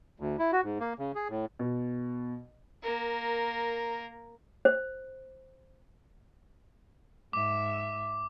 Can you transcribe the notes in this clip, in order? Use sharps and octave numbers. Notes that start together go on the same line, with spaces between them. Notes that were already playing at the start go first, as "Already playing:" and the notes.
D2
E4
F#4
G#2
A#3
C#3
G#4
A2
B2
A#3 A#4
C5
G#2 E5 D6